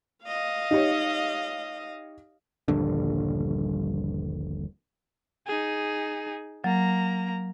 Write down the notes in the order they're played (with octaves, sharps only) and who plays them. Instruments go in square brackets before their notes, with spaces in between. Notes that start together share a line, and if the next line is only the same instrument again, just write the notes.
[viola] D#5 F5
[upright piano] D#4 G4 C#5
[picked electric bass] D#1 A#1 G2 D3
[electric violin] D#4 G#4
[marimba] F#3 [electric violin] A#3 A#5